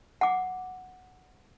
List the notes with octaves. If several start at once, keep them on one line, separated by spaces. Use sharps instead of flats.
F#5 D6